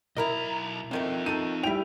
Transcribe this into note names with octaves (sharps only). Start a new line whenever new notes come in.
B1 E4 A#4 D#5 A#5
C3 D#3 A3 C4 F4
D#4 A4 D#7
G3 E4 E5 G5 F7